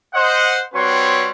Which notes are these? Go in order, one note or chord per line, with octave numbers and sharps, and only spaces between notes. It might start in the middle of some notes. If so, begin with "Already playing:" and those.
C5 D#5 F#5
G3 C4 F#4 B4 C#5 C6